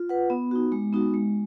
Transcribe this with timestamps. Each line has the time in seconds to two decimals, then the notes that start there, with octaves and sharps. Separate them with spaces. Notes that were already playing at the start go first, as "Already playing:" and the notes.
Already playing: F4
0.09 B4 F#5
0.30 B3
0.51 D#4 F#4
0.72 G#3
0.93 B3 D#4 F#4
1.14 G#3